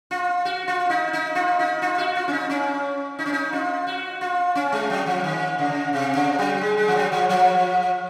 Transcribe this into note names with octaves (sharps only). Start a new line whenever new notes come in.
F4
F#4
F4
D#4
D#4
F4
D#4
F4
F#4
F4
C#4
D#4
C#4
D#4
C#4
D#4
F4
F#4
F4
C#4
G#3
F#3
F3
D#3
C#3
C3
C#3
F#3
G#3
G#3
F3
F#3
F3
F3